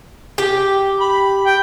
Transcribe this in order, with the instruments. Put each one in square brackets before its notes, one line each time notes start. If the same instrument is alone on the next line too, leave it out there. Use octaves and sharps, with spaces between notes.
[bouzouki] G4
[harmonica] B5
G5